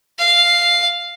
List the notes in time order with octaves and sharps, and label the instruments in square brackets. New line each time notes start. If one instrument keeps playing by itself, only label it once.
[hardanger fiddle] F5